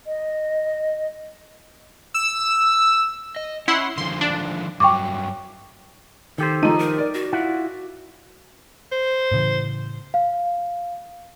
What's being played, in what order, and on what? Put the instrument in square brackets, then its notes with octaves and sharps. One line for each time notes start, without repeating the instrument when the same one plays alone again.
[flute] D#5
[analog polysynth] E6
[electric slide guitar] D#5
[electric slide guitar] C#4 [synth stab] E4 F#5 C6
[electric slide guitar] D3 D#3 F3 [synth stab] C6
[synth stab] D4
[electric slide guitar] G2 F#3 [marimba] G5 C#6 D6
[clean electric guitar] D#3 G4 C5 [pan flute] A4
[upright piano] F3 D#7 [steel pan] D#4
[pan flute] A#4
[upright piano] D5
[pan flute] F#4
[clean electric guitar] E4 F4 F#5
[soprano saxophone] C5
[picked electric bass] A2 C#3 E3
[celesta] F5